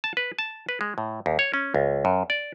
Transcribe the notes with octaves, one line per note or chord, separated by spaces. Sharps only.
A5
B4
A5
B4
G#3
A2
D#2
C#5
C#4
C#2
F#2
D5